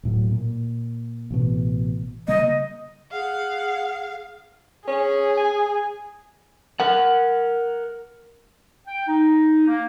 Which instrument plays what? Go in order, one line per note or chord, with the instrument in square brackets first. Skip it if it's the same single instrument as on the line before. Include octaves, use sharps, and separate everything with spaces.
[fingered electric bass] D1 A2 F#3
A#2
A1 B2
[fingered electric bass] C#3 G3 A#3 [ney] D#5
[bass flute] G#4 [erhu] F5 [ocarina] F#5
[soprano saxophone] C#4 [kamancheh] G#4
[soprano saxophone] G#5
[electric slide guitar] A#4 F#5
[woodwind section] G5
D#4
A#3